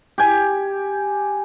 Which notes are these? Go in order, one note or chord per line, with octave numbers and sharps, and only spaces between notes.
G4 G#5